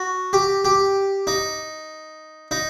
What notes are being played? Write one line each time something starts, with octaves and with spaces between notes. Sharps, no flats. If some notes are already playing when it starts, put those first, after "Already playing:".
Already playing: F#4
G4
G4
D#4
D#4